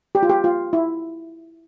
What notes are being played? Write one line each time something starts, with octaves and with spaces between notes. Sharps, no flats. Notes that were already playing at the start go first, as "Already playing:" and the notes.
G4
F4
G4
F4
E4